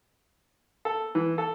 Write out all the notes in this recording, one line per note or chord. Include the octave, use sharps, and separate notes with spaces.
A4
E3
A4